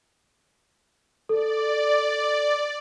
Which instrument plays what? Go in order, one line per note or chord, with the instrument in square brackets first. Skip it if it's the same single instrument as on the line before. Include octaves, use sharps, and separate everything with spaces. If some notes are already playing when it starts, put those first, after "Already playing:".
[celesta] A4 [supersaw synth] D5